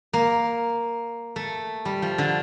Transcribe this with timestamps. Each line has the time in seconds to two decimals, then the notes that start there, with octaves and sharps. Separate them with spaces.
0.13 A#3
1.36 A3
1.85 G3
2.02 F3
2.18 D3